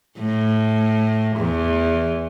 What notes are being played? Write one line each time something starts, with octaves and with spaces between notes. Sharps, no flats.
A2
E2